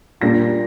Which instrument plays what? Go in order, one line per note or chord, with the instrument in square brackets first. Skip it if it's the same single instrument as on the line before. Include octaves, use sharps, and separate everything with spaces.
[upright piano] A#2 G3 A#3 D4 F4 A#6